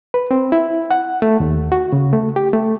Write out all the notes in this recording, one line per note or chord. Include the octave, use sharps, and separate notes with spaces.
B4
C4
E4
F#5
A3
D#2
F#4
C#3
A3
G4
A3